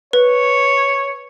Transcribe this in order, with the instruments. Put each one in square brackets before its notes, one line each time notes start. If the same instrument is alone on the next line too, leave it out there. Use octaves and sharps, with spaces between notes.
[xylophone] B4 [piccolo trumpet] C#5